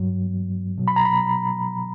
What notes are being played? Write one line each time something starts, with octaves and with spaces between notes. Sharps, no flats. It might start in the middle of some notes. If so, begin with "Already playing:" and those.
Already playing: G2 F#3
B2 F#3
B5
A#5
B5